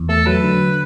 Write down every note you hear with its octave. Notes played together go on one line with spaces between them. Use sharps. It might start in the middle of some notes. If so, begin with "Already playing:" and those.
Already playing: E2
A3 A4
F#3 B4
D3